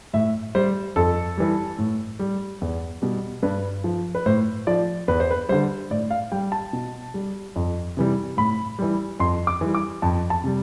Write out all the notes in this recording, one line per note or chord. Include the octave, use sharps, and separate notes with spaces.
A2 E5
G3 C5
F2 A4
E3 G3
A2
G3
E2
B2 G3
G2 B4
F3
B4
A2 C5
F3 D5
E2 B4
C5
B4
D3 G3 C5
A2 D5
F5
G3 G5
A5
B2
G3
F2
C3 E3 G3
A2 B5
E3 G3
F2 C6
D6
E3 G3
D6
F2 A5
A5
C3 G3